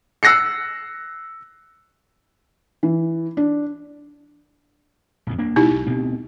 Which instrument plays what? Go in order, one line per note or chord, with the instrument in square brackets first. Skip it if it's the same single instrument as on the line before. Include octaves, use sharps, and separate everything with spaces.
[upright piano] E6 F#6 A#6 C7 C#7
[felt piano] E3
D4
[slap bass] A#1 F2 D3
D#1 A#3 D4
[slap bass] B2 G#3 [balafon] D#4 E4 G4
[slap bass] B1
D2 B2 C4